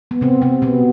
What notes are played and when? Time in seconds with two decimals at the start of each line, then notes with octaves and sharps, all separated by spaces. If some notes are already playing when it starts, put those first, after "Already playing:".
0.11 B3
0.21 C3 C4
0.42 C3 C4
0.62 B2 B3